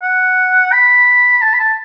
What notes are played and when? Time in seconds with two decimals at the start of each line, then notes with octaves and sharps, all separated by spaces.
0.03 F#5
0.72 B5
1.42 A5
1.53 B5
1.59 A5